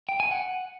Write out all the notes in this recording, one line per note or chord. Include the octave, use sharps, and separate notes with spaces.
G5
G#5
F#5